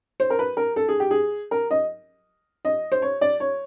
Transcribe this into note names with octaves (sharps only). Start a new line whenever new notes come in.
C5
A#4
B4
A#4
A4
G#4
G4
G#4
A#4
D#5
D#5
C5
C#5
D5
C#5